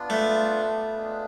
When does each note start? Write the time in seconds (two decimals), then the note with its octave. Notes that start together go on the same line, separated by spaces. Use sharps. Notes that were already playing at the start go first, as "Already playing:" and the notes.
Already playing: B3 D4 F4
0.10 A3
0.95 G#3 B3 D4 F4